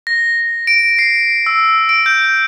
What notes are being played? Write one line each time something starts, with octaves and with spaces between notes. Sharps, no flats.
A#6
D7
C7
E6
D7
G6